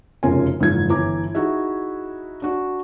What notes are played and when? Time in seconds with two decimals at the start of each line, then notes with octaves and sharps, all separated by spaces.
0.23 F1 F#2 C#3 F4 A#4 G#5
0.60 F#1 G#2 E3 F3 G#6
0.89 G1 E3 A#5 D6
1.35 D#4 E4 F#4 G#4 E5
2.42 D4 F#4